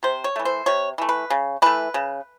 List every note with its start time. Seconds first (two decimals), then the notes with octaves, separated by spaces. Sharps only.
0.03 C3 C5
0.24 C#5
0.36 E3 A3
0.45 C5
0.66 C3 C#5
0.98 E3 A3
1.09 B4
1.30 C#3
1.62 E3 A3 B4
1.94 C#3